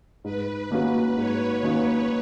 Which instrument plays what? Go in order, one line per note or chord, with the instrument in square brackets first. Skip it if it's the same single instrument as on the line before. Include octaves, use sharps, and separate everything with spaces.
[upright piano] G#2 [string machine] B4
[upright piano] D#3 A#3 C#4 F#4
[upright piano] G#2 [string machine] C#5
[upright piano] D#3 A#3 C#4 F#4 [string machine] B4